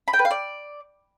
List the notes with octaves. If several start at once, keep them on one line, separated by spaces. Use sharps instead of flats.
B5
G5
B4
F5
D5